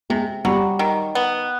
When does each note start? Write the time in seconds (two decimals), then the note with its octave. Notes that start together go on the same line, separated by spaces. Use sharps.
0.10 C3 G#3
0.45 F#3 G3
0.79 D#3
1.15 B3